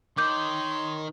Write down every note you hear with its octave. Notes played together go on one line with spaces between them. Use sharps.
D#3 C#5 C6 D6 G6